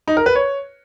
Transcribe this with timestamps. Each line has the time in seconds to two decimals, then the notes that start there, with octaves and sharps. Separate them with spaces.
0.07 D#4
0.17 A#4
0.26 B4
0.35 C#5